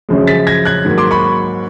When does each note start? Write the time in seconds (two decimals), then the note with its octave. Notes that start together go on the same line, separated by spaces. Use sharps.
0.09 F#2 C#3 F3 G#3
0.27 A6 B6
0.47 G#6 A#6
0.65 F#6 G#6
0.85 G#2 D#3 F#3 A#3
0.98 C6 D6
1.11 B5 C#6